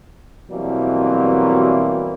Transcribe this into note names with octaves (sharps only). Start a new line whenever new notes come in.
B2 E3 F#3 G3 A#3 C4